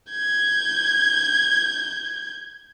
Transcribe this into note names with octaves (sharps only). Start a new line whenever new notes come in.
G6 G#6